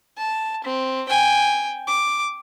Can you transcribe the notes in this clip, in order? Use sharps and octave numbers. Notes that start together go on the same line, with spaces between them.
A5
C4
G5 G#5
D6